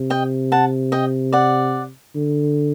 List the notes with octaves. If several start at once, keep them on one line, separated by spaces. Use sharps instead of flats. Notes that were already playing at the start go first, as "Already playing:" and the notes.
Already playing: C3
D#5 G5
F#5 A5
D#5 G5
D5 F#5
D3